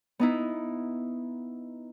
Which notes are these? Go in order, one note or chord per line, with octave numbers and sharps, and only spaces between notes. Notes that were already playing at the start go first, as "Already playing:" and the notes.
B3 D#4 E4